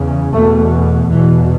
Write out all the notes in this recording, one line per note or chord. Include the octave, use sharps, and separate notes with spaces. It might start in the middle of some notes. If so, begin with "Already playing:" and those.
Already playing: E2 C#3
E2 B2 A3
E2 B2 E3